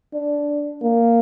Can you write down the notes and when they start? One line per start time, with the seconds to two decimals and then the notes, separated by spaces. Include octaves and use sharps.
0.13 D4
0.82 A#3